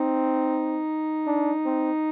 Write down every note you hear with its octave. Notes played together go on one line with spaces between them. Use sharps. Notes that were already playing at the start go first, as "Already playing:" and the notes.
Already playing: C4 D#4
D4
C4